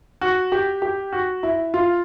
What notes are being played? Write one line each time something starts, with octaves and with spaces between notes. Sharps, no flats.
F#4
G4
G4
F#4
E4
F4